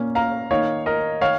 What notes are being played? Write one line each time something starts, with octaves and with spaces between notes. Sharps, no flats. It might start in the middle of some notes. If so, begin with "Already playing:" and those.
Already playing: A#2 A#3 C#4
F5 A#5
D#3 A#3 D#4 C#5 F5
A#4 D#5
D#3 C#5 F5